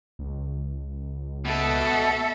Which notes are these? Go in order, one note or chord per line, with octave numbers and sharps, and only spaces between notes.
C#2
B2 A4 E5